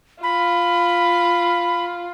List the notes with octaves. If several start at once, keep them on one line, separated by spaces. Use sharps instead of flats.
F4 B5